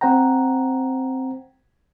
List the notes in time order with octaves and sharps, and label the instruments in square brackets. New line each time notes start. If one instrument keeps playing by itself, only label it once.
[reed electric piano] C4 C5 F#5 G5 A#5